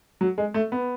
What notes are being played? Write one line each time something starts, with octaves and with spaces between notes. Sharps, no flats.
F#3
G#3
A3
B3